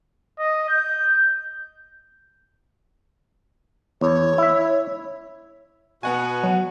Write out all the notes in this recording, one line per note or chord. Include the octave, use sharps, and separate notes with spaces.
D#5
G6
E2 C#5
E4 E5
B2 B3 F#4 F#5 G#5
F#3